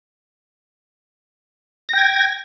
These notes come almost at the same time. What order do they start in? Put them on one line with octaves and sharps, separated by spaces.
A#6 G5 G#6